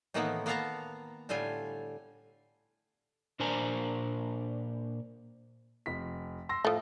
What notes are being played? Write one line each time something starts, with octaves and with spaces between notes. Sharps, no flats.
A2 D#3 E3 A#3 B3 F#5
A#3 B3 F5 F#5 A5 A#5
A2 D3 G3 F4 G#5
A#2 D4 A#4 C5 G#5 A#5
F1 B6
C6 E6 A#6
A2 F3 A3